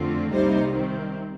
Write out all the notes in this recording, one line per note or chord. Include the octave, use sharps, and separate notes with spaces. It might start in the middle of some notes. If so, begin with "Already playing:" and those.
Already playing: F2 D3 A3 C4 F4
C2 C3 G3 A#3 D#4 C5
C3 D#3 G3 C4